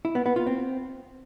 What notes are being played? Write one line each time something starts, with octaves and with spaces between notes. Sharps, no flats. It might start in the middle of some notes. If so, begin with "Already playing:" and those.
E4
B3
B3
F4
C4